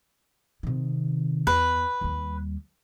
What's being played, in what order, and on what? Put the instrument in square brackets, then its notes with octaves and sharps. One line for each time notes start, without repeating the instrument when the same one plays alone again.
[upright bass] C3 D#3
[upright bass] E2 [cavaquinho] B4
[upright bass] D#2 G3